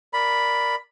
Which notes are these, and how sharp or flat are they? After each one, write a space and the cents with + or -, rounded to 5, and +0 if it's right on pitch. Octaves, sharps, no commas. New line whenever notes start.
A#4 +0 D5 +0 B5 +0